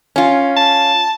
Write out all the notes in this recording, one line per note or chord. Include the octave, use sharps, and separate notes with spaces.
C#4 F4
A5